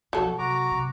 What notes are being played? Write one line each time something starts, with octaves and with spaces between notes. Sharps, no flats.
B2 F3 F#3 A4
C3 F#4 A#5 D6
C3